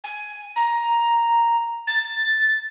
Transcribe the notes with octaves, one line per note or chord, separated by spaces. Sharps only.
G#5
A#5
A6